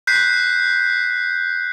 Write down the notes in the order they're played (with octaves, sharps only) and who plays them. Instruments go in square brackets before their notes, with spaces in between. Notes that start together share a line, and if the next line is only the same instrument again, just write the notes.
[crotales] F#6 G6 B6 C7